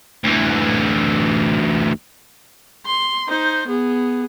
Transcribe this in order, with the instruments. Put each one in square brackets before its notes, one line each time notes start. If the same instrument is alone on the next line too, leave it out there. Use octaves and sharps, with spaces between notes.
[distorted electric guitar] D2 E3
[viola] C6
D#4 C5
B3 G#4